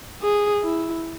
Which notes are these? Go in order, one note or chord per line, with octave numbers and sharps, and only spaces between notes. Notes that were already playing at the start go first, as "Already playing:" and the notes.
G#4
E4